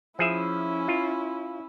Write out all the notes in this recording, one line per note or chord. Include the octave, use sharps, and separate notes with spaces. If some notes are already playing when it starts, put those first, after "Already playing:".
F3 C#4 E4 G#4 E5
F4